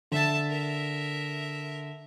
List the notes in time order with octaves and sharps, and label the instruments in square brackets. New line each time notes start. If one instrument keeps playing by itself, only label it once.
[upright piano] D3 [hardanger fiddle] E5 A5
[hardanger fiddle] A#4 E5